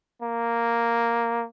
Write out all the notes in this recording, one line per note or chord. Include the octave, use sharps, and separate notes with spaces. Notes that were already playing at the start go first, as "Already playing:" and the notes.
A#3